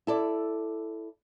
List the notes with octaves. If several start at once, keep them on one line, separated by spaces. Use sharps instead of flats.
E4 A4 D5